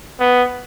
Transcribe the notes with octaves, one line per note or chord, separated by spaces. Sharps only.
B3